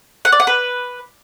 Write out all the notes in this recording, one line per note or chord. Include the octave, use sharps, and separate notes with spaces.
F#5
D5
F#5
B4